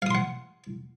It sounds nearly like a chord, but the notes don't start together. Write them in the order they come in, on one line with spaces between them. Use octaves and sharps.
F5 D#6 C6 F#5